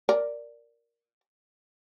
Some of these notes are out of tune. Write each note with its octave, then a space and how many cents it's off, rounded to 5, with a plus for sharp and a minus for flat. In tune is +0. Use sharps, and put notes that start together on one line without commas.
A#4 +5 D5 +0